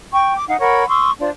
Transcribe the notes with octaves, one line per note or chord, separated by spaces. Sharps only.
G5 C#6
D6
D#4 F5 F#5
A#4 C#5 F#5 B5
C6 C#6 D#6 E6
D4 F4 C5 D5